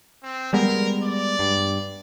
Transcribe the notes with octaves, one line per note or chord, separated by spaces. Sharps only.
C4
G3 G#3 B3 A#4
D5
G2